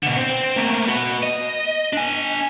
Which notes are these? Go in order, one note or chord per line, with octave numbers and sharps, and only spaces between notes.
B2 D3
C4
A3 A#3
B3 F#4
D#5
D4 G#5